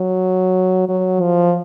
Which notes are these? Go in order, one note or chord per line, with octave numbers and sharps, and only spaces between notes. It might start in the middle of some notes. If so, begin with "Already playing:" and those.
Already playing: F#3
F#3
F3